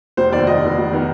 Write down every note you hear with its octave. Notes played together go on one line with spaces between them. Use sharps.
F1 C5
D#2 D#3 B3 D5
F1 D#5
D#2 D#3 B3
F1
D#3 B3